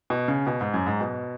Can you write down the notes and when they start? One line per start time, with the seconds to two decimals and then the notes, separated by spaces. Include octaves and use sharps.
0.10 B2
0.28 C#3
0.47 B2
0.61 G#2
0.74 F#2
0.86 G#2
1.01 B2